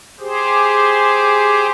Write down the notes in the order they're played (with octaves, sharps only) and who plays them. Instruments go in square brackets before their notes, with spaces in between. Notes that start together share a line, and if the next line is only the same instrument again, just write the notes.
[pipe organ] G4 G#4 C5